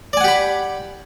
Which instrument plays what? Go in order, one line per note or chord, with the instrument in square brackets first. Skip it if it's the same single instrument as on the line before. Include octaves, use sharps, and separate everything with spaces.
[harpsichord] D5
G#5
F#5
G4
B5